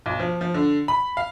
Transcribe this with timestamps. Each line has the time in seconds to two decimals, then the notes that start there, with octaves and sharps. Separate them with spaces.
0.06 B1
0.20 F3
0.41 F3
0.54 D3
0.88 B5
1.17 F5